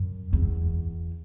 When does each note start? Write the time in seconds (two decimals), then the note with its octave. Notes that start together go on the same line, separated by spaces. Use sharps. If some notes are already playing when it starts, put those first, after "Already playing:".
Already playing: F#2
0.33 E2